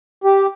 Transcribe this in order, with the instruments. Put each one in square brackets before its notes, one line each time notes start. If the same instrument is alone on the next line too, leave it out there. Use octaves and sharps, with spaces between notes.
[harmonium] G4